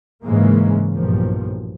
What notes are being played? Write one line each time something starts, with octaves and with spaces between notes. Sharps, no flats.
G#2 C#3 E3 G#3 A#3
B1 G2 A#2 F3